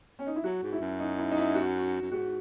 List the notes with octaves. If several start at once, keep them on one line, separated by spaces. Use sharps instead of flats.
C#4
D#4
E4
F#3 F#4
G#2
E4
F#2
D#4
E4
D#4
E4
F#4
F#2
G#2 F#4